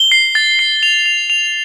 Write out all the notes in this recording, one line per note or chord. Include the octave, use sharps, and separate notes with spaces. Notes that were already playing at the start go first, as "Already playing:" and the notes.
Already playing: G7
C7
A6
C7
F7
F7
F7